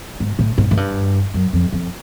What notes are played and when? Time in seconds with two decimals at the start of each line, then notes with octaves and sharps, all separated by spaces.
0.20 G#2
0.39 A2
0.58 G#2
0.71 G#2
0.77 G2
1.34 F#2
1.53 F2
1.72 F2